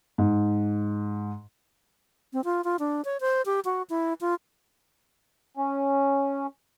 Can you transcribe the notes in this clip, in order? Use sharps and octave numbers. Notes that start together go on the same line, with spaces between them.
G#2
C4
F4
F4
D4
C#5
C5
G4
F#4
E4
F4
C#4